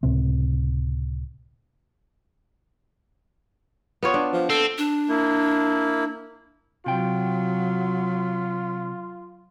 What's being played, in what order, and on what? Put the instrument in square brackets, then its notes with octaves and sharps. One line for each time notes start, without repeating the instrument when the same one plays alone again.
[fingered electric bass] C#2 A2 C3 C4
[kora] B3 F4 C#5
D4
[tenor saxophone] F3
[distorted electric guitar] C4 [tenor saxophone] A4
[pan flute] D4
[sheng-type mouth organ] A#3 E4
[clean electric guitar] C3 G5 [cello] F#3 [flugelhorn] F4 [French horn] F#4